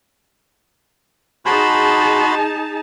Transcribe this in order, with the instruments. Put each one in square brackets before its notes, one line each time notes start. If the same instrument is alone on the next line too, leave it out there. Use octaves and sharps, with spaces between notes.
[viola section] D#4 G#4 A5 [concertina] F#4 B5 C6